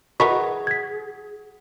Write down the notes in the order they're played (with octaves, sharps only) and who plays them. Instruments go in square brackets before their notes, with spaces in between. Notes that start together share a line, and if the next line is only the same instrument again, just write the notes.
[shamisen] E3 A#4 D#5 [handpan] F#4 [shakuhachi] G#4 [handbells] B5 C#6 B6
[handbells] G#6 B6